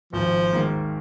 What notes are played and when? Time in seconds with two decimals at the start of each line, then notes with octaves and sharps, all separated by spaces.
0.13 G#1 F3
0.53 G#2 D#3 A#3